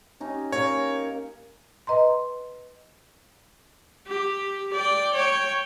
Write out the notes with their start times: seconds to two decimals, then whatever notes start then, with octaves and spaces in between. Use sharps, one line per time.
0.20 C#4 D#4 G4
0.52 A#3 C#4 A#4 C#5
1.87 B4 D#5 A#5 C6
4.07 G4
4.73 D5 G5
5.14 C#5 G5